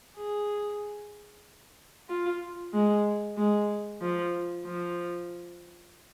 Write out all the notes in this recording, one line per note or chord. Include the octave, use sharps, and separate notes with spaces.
G#4
F4
G#3
G#3
F3
F3